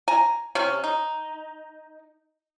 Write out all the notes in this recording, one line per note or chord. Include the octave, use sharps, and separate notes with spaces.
G#5 A#5
C3 C#4
D#4